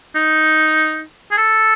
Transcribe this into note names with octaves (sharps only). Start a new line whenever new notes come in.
D#4
G#4
A4